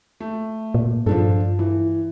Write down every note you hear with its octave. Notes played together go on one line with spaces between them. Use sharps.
A3
A#2
G2 F3 D4 A4
E3